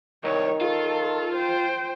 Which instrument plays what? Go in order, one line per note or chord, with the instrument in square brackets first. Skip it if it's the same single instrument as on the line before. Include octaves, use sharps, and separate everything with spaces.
[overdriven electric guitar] C2 [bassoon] D#3 [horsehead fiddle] C#5
[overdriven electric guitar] F4 [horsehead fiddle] A4
[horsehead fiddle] C5 G5